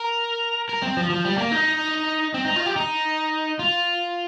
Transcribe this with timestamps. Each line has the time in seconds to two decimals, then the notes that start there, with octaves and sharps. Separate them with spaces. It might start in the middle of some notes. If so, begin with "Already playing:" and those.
Already playing: A#4
0.69 A#4
0.82 C4
0.97 F3
1.10 F3
1.25 G3
1.38 A#3
1.51 D#4
2.34 C4
2.45 D#4
2.56 F4
2.66 G4
2.76 D#4
3.59 F4